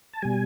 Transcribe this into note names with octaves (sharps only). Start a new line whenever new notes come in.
A5
B2 G3 G#5